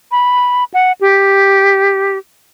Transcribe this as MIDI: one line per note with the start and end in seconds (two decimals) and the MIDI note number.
0.11 0.64 83
0.74 0.92 78
1.01 2.18 67